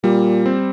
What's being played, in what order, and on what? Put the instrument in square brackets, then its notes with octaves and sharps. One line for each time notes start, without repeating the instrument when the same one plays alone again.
[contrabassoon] A#2 [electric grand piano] G3
[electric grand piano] C4